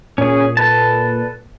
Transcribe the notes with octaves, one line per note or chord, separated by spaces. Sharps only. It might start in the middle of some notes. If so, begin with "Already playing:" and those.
A#2 C#4 G#4
A4 B4 A5